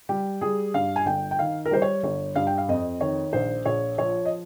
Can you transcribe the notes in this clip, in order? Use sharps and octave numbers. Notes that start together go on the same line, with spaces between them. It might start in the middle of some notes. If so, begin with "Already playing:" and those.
G3 G4
G3 G#4
G2 F5
G#5
G1 G5
G5
D#3 F5
A#4
G3 C5
C#5
G1 C#5
G2 F5
G5
F5
F2 D#5
D#3 C#5
A#1 C5
A#1 C#5
F3 C#5
D#5